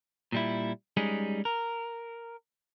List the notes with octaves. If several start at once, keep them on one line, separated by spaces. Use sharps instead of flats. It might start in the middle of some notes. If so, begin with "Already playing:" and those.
A#2 G3 E4
G3 G#3 C#4 D#4 G#4
A#4